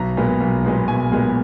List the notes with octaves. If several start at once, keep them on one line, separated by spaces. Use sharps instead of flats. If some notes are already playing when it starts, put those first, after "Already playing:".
Already playing: B1 A#5
A#2 G#3 B3
B1
A#2 G#3 B3
B1 G#5
A#2 G#3 B3